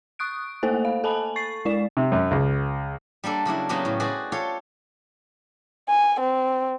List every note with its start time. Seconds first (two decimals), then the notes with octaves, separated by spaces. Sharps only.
0.19 C#6 D#6 F#6 D7
0.63 A3 A#3 A4 C5 G#5
0.85 F5
1.04 A4 G#5 A5 B5
1.36 C#6 A6 C7
1.65 G#3 E4 D5 E7
1.97 C3
2.12 F#2
2.31 C#2
3.24 G3 A#3 D4 A4
3.45 C#3 F#3 D4 E4
3.69 C#3 F#3 A#3 B3 C#4 G4
3.85 A2
4.00 F#4 G#4 B4 C5 D5
4.32 F4 G4 A4 C#5 F5
5.89 G#5
6.20 C4